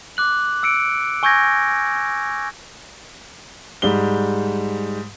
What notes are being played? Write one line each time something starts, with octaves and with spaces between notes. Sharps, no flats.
D6 F#6 F#7
E6 C#7 D7
G#5 C#6 E6 G6 G#6 A#6
G#2 G3 G#3 G7